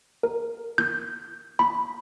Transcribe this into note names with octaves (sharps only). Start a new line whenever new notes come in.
A#4
G6
B5